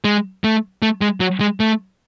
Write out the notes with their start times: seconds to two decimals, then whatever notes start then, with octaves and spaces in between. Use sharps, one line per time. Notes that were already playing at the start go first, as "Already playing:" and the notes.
0.04 G#3
0.44 A3
0.82 A3
1.01 G#3
1.20 F#3
1.40 G#3
1.60 A3